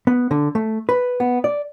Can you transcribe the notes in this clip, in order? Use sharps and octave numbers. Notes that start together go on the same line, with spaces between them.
B3
D3
A3
B4
B3
D5